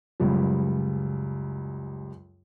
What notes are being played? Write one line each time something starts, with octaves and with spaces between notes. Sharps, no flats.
C#2 F#2 G3